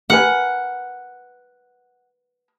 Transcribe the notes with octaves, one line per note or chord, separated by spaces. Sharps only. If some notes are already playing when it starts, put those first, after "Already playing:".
A#4 B4 F#5 G#5